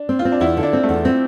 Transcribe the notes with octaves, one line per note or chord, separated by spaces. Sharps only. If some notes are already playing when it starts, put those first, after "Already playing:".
Already playing: D4
C4
F4
C4
D4
E2 E4
D3
D4
C4
A3
E2
C4